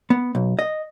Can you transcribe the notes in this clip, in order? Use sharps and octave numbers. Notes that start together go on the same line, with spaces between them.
B3
B1
D#5